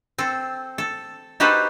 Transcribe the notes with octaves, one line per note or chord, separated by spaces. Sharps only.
C4 A4
A4
D#4 F#4 G4 A4 B4 C5